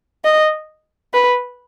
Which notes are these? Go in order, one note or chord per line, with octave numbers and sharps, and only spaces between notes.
D#5
B4